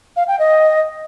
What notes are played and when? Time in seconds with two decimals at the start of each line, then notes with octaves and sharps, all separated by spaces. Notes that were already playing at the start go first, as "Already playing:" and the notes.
0.16 F5
0.28 G5
0.39 D#5